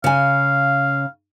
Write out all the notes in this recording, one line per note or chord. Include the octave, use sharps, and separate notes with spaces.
C#3 F5 G#5